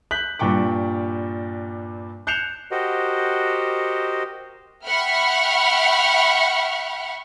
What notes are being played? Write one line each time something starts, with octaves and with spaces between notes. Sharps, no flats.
F#6 G6 B6 F#7
G2 A#2 G5 C#6 D6
F#6 G6 C7 C#7 E7 F7
F#4 G4 A#4 C5 D#5 F#5
E5 F#5 G5 B5 C#6 F6